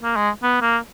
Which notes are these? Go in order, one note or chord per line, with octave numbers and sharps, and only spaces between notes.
A#3
G#3
B3
A#3